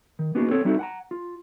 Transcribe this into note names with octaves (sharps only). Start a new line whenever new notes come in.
D#3
A#3 B3 C#4 D#4 F#4 G#4
C4 A4 C#5
G3 C4 D#4 E4 F#4 A4
F#5 G#5 A#5
F4